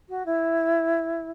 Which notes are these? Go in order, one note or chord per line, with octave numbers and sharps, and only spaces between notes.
F#4
E4